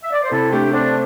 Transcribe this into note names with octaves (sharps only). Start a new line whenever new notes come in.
E5
D5
C5
C3 E4 A4
A3 D4 G4
C4 D4